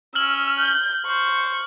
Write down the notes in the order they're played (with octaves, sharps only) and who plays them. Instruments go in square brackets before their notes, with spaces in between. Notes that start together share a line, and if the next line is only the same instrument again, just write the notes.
[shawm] C#4 [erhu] E6 [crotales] F6 F#7
[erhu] G6
[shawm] C5 [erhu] C#6